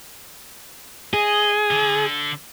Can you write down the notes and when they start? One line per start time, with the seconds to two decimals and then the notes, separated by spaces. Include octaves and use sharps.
1.14 G#4 D#5
1.71 D3